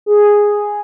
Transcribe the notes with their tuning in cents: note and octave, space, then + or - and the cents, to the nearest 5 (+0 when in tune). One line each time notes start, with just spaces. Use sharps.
G#4 -5